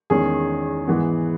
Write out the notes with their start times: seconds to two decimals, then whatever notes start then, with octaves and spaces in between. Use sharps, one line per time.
0.10 E2 D#3 G#3 C#4 G#4
0.87 G#2 E3 B3